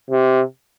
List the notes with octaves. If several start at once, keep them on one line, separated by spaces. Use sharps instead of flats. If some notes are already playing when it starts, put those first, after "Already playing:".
C3